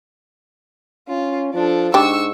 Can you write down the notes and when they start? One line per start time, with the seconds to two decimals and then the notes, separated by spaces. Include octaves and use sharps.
1.08 C#4 F4
1.54 F3 D4 A4
1.94 G#2 D4 G4 C#6 E6